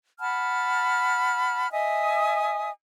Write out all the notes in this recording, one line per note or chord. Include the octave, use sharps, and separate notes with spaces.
F#5 A5 B5 F6
D#5 E5 G#5 D#6